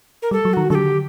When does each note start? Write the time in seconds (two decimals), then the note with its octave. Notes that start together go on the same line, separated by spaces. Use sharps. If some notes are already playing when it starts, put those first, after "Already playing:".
0.22 A#4
0.31 G3 A4
0.45 F#3
0.53 D#3 F#4
0.70 D3 F#3 A4
0.75 G4